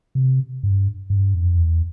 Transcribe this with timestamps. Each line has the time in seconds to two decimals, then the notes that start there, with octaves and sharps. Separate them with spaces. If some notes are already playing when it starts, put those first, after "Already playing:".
0.15 C3
0.63 G2
1.10 G2
1.34 F2
1.57 E2